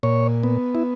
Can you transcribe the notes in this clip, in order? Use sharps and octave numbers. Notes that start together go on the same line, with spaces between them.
A#2 C#5
B3
E4